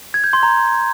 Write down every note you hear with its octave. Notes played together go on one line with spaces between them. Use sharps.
G#6
G6
C6
A#5